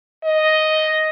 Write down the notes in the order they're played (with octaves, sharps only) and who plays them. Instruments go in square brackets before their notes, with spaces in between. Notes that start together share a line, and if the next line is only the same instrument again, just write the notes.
[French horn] D#5